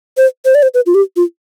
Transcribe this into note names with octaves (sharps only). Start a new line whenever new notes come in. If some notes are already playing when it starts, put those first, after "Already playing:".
C5
C5
D5
C5
B4
F4
G4
F4